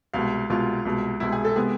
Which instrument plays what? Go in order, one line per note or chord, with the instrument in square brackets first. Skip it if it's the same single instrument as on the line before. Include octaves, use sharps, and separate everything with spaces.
[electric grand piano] C2 B2 G#3 [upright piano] F5
[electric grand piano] C2 B2 G#3 [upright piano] F4
[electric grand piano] C2 B2 G#3
[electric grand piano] C2 B2 G#3 [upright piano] E4
[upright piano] G#4
A4
[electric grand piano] C3 G#3 B3 E4 [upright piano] G#4